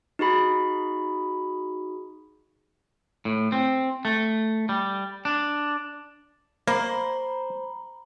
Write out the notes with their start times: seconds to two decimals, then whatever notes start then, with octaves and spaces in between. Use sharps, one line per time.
0.19 D#4 F#4 G#4 B5
3.25 A2
3.52 C4
4.05 A3
4.69 G3
5.25 D4
6.68 A#3 C5 A#5 B5